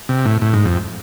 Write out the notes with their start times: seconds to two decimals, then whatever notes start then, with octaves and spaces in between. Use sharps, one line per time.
0.09 C3
0.25 A2
0.41 A2
0.53 G#2
0.66 F2